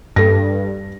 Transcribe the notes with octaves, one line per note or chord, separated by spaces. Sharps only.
G2 A4 A#6